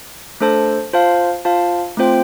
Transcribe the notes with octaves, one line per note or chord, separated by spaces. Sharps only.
A3 D4 A4 C5 A5
F4 C5 F5 A5
F4 C5 F5 A5
A3 C4 F4 C5 G5